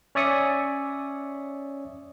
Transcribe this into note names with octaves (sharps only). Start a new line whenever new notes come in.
C#4 C#5 D5 E5 D#6 C#7